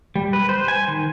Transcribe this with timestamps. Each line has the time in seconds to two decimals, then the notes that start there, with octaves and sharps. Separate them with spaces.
0.16 G3
0.33 B4
0.49 C5
0.68 G#5
0.88 D#3